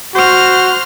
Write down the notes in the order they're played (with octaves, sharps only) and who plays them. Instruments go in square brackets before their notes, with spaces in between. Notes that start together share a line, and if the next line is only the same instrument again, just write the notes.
[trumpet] F#4 [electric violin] C5 F6